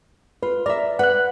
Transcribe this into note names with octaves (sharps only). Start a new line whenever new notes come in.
F4 B4
A#4 D5 E5
B4 F#5 F#6